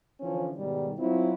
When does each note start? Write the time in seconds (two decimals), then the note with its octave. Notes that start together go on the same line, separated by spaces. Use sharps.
0.20 D3 E3 F3 C#4
0.57 G#2 B2 D#3 G3
0.97 F#3 C4 E4 F4